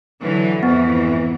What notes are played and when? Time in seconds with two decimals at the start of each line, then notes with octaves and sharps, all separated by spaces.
0.21 D3 E3 F#3
0.63 F2 G#2 E3 B3